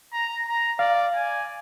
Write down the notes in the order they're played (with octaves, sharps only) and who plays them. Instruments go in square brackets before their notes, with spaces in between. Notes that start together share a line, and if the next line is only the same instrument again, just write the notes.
[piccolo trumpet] A#5
A#5
[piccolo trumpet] D5 [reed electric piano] F5
[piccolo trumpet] G#5